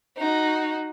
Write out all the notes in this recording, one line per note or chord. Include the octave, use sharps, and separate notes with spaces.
D#4 F#4